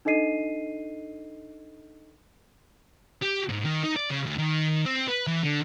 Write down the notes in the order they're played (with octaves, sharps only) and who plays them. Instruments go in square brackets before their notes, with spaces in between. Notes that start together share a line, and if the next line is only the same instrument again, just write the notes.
[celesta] D4 D#4 A4 D#5 C7 D#7
[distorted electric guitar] G4
G#2
D#3
D#4
D5
C#3
D2
D#3
C4
B4
E3
D3